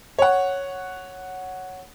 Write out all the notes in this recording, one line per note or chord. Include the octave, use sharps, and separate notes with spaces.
C#5 F#5